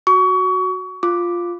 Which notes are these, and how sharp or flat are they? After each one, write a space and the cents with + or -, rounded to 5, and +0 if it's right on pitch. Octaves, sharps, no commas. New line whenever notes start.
F#4 +0 C#6 +30
F4 +0 D6 +0